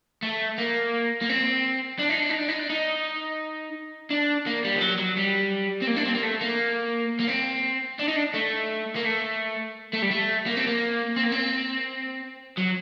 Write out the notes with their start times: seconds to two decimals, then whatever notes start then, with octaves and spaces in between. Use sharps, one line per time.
0.23 A3
0.58 A#3
1.22 A#3
1.29 C4
1.99 D4
2.09 D#4
2.20 D4
2.30 D#4
2.39 D4
2.49 D#4
2.60 D4
2.70 D#4
4.10 D4
4.46 A#3
4.64 G3
4.75 D#3
4.81 F#3
4.99 F#3
5.17 G3
5.82 C4
5.87 A#3
5.96 D4
6.05 C4
6.14 A#3
6.23 A3
6.41 A#3
7.20 A#3
7.28 C4
7.99 D4
8.08 D#4
8.16 D4
8.34 A3
8.96 A#3
9.05 A3
9.93 A3
10.02 G3
10.11 A3
10.46 A#3
10.57 C4
10.67 A#3
11.16 C4
11.24 A#3
11.32 C4
12.58 F#3